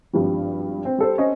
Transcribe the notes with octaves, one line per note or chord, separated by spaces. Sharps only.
G#1 G2 F3 G3
C4
G3 A4 C5
C#4 C5 D#5